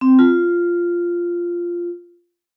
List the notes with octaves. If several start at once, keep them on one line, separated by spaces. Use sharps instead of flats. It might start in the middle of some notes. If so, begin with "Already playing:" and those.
C4
F4